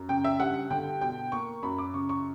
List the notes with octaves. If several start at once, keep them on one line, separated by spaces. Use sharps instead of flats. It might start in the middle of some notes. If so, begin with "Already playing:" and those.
Already playing: F#2
C#3 G5
E5
G2 F#5
D3 G5
B2 G5
A#3 C#6
F#2 B5
D6
C#3 C#6
C#6